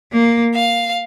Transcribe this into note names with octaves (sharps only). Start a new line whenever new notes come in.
A#3
F5